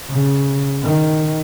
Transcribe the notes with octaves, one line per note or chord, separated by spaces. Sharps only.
C#3
D#3